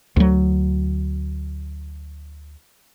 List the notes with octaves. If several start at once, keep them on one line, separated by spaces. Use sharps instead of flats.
D2 F#3